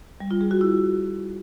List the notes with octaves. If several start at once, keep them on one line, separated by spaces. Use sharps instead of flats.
G3
F4
G#4
F#4
E4